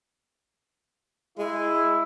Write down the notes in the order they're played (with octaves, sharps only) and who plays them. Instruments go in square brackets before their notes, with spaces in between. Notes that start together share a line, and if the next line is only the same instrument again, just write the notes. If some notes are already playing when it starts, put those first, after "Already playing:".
[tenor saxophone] G#3 [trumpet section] E4